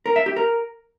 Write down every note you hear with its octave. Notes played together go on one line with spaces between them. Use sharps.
A#4
E5
G4
A#4